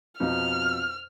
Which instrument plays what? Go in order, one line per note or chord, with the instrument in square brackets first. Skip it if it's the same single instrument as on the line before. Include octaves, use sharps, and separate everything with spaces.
[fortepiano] F2 B2 D#4 [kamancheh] F6